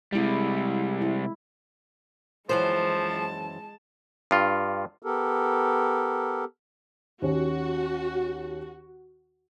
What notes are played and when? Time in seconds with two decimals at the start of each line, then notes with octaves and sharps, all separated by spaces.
0.13 C3 G3 G#3 E4
1.02 E4
2.49 F#2 E3 F3 G#3 C5 A5
4.31 G2 F4
5.02 B3 G4 A4 A#4
7.22 D#2 C#4 F#4